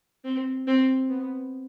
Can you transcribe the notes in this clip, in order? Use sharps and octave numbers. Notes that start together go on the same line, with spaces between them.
C4
C4
B3